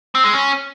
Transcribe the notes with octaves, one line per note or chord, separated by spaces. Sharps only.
C4
G#3
C#4